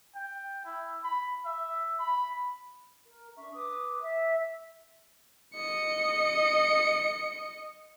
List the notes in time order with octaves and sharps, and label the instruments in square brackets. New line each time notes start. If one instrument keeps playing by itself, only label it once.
[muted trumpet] G5
E4
B5
E5
B5
[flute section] A#4
D4 E5 C#6
B4 D6 D#6
E5
[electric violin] D#5 C#7